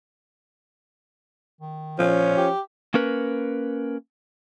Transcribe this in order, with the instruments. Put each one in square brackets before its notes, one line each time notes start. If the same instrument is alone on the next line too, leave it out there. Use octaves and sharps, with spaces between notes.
[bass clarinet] D#3
[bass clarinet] A#2 [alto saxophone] F3 [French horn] C#4
[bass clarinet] G4
[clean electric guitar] A#3 C#4 A#4 B4